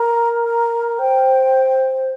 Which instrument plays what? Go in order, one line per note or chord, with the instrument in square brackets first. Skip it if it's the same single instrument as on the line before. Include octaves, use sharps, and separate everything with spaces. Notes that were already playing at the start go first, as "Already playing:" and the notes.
Already playing: [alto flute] A#4 [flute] A#5
[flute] A#5
[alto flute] C5 [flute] G5